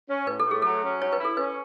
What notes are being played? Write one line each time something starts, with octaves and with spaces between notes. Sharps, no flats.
C#4
A2 B4
A4
A3
G#4
F#3 A4
C#4
F#3 C#5
B4
E4
A4
C#4 B4